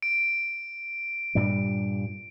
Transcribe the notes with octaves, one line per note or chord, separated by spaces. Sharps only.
D7
G2 A#2 G3